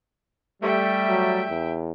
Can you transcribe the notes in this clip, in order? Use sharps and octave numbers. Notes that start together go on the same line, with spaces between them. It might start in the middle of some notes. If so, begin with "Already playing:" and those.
G3 A3 E5 G5
F#3
E2